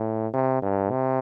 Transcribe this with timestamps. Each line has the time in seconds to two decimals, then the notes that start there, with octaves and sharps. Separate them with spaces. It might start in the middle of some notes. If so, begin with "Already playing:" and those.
Already playing: A2
0.33 C3
0.62 G2
0.90 C3